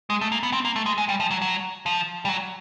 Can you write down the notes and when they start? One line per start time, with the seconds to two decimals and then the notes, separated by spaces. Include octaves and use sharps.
0.10 G#3
0.21 A3
0.32 A#3
0.43 B3
0.53 C4
0.65 A#3
0.76 A3
0.86 G#3
0.98 G#3
1.09 G3
1.20 F3
1.31 F#3
1.42 F#3
1.86 F3
2.25 G3
2.29 F#3